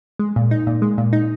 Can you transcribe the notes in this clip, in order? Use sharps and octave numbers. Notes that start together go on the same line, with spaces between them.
G#3
A#2
D#4
A#2
G#3
A#2
D#4